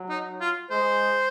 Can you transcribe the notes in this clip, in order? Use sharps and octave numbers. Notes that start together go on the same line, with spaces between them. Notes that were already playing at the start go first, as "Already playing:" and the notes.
Already playing: F#3
D#4
F4
G#3 C5